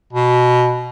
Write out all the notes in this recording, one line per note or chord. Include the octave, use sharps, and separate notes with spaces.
B2